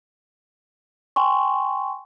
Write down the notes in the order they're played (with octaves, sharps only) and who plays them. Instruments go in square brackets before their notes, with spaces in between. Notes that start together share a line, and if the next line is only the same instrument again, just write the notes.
[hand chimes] G5 G#5 C6 C#6